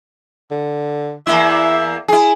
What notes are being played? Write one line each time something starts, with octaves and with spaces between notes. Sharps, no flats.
D3
E2 A#3 E4 E5
E4 G#4